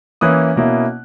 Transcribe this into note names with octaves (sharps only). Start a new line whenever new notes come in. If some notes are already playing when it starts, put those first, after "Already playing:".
E3 A#3 C#4 E4 D#6 F#6
B2 A#3 C#4 E4